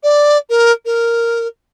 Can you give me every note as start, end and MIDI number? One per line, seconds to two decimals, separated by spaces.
0.03 0.37 74
0.50 0.72 70
0.85 1.47 70